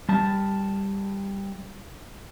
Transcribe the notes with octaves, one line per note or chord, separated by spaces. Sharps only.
G3 A5